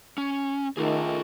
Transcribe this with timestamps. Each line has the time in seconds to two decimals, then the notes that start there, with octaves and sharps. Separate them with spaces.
0.18 C#4
0.77 D#3 A3 F4 G#4